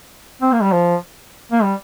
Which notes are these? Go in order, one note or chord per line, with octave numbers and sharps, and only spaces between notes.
C4
A#3
G3
F3
A#3
G3